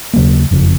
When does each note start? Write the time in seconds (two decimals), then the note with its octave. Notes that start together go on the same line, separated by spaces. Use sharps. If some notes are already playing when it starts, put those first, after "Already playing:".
0.14 D#2 C#3 F#3 A#3
0.51 F#1 F2 C#3